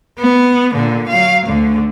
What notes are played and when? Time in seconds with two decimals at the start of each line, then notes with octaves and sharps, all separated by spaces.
0.18 B3
0.74 A#2 D3
1.09 F#3 F5
1.47 D2 D3